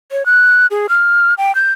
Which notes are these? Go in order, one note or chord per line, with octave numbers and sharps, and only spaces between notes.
C#5
F#6
G#4
F6
G5
G6